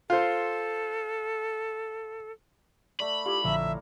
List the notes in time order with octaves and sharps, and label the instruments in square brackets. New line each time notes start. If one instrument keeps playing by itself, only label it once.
[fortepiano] F4 C5 [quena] A4
[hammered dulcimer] A3 D5 [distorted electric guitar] B5
[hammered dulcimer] E4 F4 [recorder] G4
[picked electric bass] A#1 D3 F3 [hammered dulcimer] A2 A3 A#5 [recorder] E5